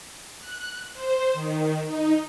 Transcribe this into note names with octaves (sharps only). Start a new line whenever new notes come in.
F#6
C5
D#3
D#4